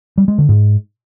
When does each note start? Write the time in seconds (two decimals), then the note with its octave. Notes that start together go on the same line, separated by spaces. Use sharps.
0.18 G3
0.28 G#3
0.38 D3
0.49 G#2